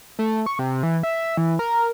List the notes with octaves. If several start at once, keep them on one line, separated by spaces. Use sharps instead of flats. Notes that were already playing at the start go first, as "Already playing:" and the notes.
A3
C#6
C3
E3
E5
E3
A#4